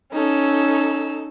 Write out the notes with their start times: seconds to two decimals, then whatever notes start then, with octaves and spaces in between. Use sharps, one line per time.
0.12 C#4 D#4 A4 E6